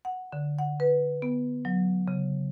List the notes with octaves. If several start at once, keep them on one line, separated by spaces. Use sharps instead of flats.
F#5
D3
F#5
B4
B3
F#3
C#3